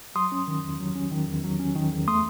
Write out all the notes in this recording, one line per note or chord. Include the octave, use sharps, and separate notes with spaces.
F#3 C6 D#6
C#4
D#3
E2
F#3
C#4
D#3
E2
F#3
C#4
D#3
E2
A3 C6 D#6